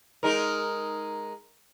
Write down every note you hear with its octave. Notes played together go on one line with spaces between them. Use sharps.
G#3 D#4 A#4